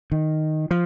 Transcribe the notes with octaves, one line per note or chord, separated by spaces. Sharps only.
D#3
F3